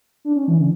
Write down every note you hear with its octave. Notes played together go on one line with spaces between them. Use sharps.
D4
C#4
E3
D3